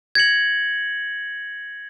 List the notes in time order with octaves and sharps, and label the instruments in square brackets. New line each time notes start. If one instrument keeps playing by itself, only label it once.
[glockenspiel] G#6 A#6 C#7 F#7